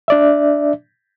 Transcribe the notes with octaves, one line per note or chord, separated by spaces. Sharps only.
D4 D5 E5